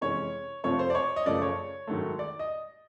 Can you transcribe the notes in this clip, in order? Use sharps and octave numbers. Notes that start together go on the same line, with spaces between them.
F2 C3 E3 G#3 C#4 C#5
F2 C3 F3 A3 C#5
C5
D5
C#5
D#5
F#2 C#3 F3 A3 D5
C#5
G#2 D#3 F#3 A3
D5
D#5